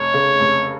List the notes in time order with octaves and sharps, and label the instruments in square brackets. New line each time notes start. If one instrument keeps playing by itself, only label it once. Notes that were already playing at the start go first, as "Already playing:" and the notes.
Already playing: [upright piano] F1 [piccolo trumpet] C#5
[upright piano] C#3
F1